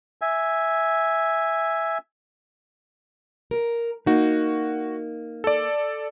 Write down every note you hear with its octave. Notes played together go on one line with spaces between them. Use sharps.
E5 G#5
A#4
A#3 D#4 F#4
A4 D5